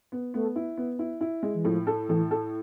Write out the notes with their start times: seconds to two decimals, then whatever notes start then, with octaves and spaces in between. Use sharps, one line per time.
0.12 B3
0.34 A3 B3
0.56 E4
0.78 B3
0.99 E4
1.21 E4
1.43 G#3
1.54 E3
1.65 A2 F3
1.87 A4
2.08 A2 E3
2.31 A4